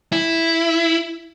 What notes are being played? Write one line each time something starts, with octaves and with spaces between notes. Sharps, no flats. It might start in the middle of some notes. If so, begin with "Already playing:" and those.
E4